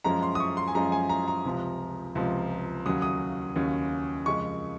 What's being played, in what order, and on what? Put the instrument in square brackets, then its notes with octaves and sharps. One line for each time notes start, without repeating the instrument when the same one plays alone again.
[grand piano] F#2 F3 G#3 C#4 A#5
C6
D#6
C#6
C6
G#5
F#2 F3 G#3 C#4 A#5
G#5
A#5
A#5
C#2 C3 F3
C#2 C3 F3
D#2 C#3 F#3 C#4 D#6
D#6
D#2 C#3 F#3 C#4
F2 C#3 G#3 C#6